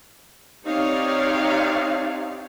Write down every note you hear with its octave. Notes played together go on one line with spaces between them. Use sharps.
C4 D#4 G4 C#5 D5 F5